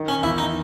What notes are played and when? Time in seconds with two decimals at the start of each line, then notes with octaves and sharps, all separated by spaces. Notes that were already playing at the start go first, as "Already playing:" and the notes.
Already playing: D#3
0.08 C#4
0.23 E2 E4
0.38 D#4